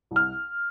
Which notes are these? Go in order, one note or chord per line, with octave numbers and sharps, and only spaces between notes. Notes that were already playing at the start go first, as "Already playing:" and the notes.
C2
F6